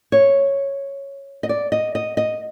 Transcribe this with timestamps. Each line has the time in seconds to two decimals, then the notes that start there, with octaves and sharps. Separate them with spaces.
0.12 C#5
1.43 D#5
1.49 D5
1.72 D#5
1.95 D#5
2.17 D#5